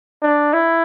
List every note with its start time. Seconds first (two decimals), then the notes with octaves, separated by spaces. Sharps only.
0.22 D4
0.53 E4